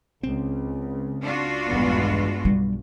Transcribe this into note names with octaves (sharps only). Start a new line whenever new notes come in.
C#2 C#3 C4
D4 F4 F#4
D#1 A#1 E2 G2 G#3 B3
B1 G3